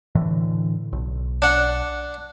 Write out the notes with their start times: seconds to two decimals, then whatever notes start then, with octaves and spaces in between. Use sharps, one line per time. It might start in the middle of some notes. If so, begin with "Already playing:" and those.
0.15 A2 D3 E3
0.93 B1
1.42 D4 F#5